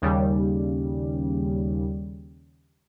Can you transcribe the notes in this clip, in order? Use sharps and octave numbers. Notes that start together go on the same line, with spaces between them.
D#2 C#3 G3